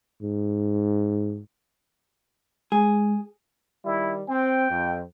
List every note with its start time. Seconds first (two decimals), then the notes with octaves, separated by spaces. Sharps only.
0.22 G#2
2.72 G#3 G#4
3.85 D#3 G3 E4
4.29 C4 G5
4.69 F2